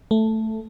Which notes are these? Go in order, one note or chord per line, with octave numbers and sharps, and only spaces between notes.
A3